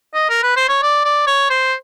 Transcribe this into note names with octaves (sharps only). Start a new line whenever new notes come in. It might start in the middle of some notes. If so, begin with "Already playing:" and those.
D#5
A#4
B4
C5
C#5
D5
D5
C#5
C5